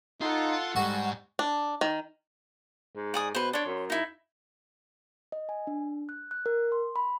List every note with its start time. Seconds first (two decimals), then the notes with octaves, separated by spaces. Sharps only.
0.21 D#4 F4 A4 F#5
0.76 G#2 G3 F#4
1.39 D4
1.81 D#3
2.95 G#2
3.14 D5 G#5 D#6
3.35 B2 B4 C5
3.53 D4 C#5 C6
3.66 F#2
3.90 D#4 E4
5.32 D#5
5.49 G#5
5.67 D4
6.09 F#6
6.31 F#6
6.46 A#4
6.72 C6
6.96 B5